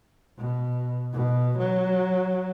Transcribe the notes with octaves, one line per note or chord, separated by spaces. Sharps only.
B2
B2
F#3